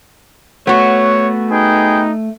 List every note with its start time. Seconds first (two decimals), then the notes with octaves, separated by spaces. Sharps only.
0.67 A3 B3 F#4 C#5
1.51 D#4 G#4 B4 G5